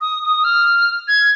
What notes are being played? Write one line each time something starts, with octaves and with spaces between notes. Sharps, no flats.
D#6
D#6
F6
G#6